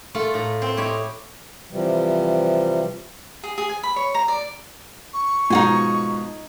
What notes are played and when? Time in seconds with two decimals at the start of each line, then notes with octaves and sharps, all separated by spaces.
0.15 A3 F4 A4
0.34 A2 A#5
0.62 C4 C5
0.77 E4 G4 C#5 D#5
1.71 C3 E3 F3 G3
3.44 G#4
3.58 G#4
3.69 G#5
3.83 B5
3.96 C#5
4.15 A#5
4.28 D5
5.14 C#6
5.50 G#2 B2 F3 D#4 F#4 G#5